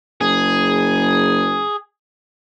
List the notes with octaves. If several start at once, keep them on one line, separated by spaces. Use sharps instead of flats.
F#1 G#4